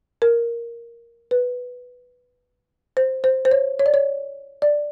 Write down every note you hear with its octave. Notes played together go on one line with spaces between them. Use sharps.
A#4
B4
C5
C5
C5
C#5
C#5
D5
C#5
D5